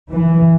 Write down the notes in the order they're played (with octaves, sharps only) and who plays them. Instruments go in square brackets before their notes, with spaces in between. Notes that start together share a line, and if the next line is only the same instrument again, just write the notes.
[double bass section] E3